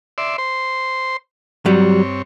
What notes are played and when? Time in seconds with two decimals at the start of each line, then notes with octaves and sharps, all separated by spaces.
0.18 D5 E5 C6
0.38 C5 C6
1.66 G2 F#3 G3 C4 C#5